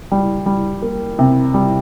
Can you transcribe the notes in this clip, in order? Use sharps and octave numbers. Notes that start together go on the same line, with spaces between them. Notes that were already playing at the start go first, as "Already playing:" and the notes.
G3
G3
A#3
C3
G3